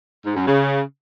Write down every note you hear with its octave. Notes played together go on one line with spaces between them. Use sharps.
G#2
F#2
C#3